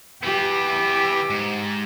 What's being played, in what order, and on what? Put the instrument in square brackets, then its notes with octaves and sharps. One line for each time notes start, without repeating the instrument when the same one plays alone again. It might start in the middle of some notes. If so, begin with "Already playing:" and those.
[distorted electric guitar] E3 B3 [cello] G4
[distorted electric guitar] G#2